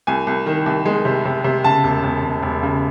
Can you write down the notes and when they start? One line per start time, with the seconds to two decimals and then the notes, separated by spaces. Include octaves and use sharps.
0.07 C2 G#5
0.27 C2
0.46 D#3
0.66 C2
0.85 G#3
1.05 C3
1.25 C3
1.44 C3
1.64 C#3 A5
1.84 E1
2.04 E1
2.23 E1
2.43 E1
2.63 C#3